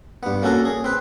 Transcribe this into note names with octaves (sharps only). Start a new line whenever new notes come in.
G2 B3
A#3 C#4 F#4 A4 A#4
G#4
C4 B4